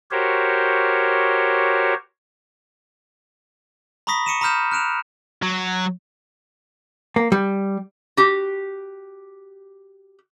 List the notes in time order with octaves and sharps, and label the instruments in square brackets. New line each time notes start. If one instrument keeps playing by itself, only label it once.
[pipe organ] F#4 G4 A#4 C5 C#5
[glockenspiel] A#5 B5 C#6 D#6 A#6 B6
C#6 C#7 D#7 E7
A#5 B5 D#6 F6 G6 E7
F6 F#6 D7 E7 F7
[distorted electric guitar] F#3
[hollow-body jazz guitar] A#3
G3
[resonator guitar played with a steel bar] F#4 G4